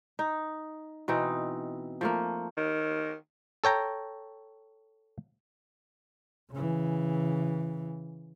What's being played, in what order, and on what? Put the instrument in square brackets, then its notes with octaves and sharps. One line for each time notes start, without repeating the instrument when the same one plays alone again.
[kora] D#4
B2 E3 C4 D#4
F3 A3 A#3
[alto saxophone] D#3
[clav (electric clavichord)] A4 C#5 G5 A#5
[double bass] C#3 E3